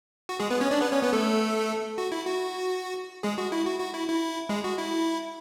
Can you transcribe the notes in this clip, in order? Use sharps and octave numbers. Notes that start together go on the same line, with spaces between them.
F#4
G#3 G#4
B3 B4
C#4 C#5
D4 D5
B3 B4
C#4 C#5
B3 B4
A3 A4
F#4
E4
F#4
G#3 G#4
F#4
E4
F#4
F#4
E4
E4
G#3 G#4
F#4
E4